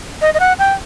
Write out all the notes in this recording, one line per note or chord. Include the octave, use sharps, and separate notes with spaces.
D#5
D#5
F#5
G5